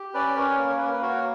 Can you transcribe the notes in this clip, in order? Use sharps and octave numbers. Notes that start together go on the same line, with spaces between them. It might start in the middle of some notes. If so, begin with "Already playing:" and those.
Already playing: G4
C#4 B4 D5
C#4 A#4 C#5
A#3
C#5
B4
A#3 A#4
B4
F#4 A#4 C#5